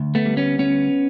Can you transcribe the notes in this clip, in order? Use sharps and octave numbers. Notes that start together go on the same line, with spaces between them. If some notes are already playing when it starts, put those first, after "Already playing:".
Already playing: D2
A3 B3
G3
B3 C#4
D2 B3 C#4